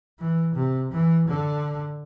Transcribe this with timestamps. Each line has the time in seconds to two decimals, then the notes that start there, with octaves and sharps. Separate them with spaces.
0.19 E3
0.55 C3
0.91 E3
1.27 D3